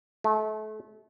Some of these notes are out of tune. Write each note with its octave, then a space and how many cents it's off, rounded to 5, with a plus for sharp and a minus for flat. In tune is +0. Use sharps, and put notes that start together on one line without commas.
A3 -30